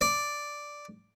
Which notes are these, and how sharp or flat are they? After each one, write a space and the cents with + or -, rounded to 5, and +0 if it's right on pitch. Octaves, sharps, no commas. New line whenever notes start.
D5 +0